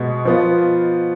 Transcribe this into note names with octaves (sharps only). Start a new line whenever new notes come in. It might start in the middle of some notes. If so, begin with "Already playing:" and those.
Already playing: B2 G#3 B3
F3 B3 F4